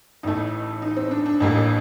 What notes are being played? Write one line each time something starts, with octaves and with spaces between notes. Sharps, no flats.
A1 A2 A3 D#4
D#4
C4
D4
D4
A1 A2 G3 A#3